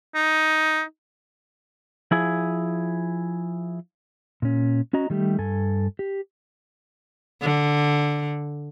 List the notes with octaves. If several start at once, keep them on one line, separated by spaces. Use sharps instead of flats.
D#4
F3 E4 G#4
A#2 C#4
C#4 F#4 D#5 A#5
D#3 G3 A3 G4
G2 A4 G#5
G4
D3